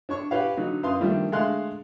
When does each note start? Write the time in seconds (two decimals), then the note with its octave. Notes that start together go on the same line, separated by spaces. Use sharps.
0.09 D4 C#5 C#6
0.31 G4 B4 C#5 F5 F#5
0.57 D3 F#3 D#4
0.83 F#2 B4 F5 C6 D#6
1.00 D#3 F3 G3 A3 A#3 D4
1.32 D3 G#3 A3 F5 C6 F#6